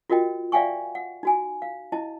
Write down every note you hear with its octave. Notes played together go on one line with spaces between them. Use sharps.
F4 F#4 A#4 D#5 G5
D5 E5 F5 G5 G#5 C#6
F#5
D#4 F#4 G#5
F5
E4 D#5 A5